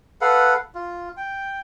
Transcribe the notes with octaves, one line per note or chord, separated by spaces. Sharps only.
A4 B4 F5 F#5
F4
G5